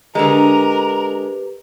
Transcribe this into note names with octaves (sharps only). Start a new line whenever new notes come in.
D3 G#3 G4 A#4 B4 A#5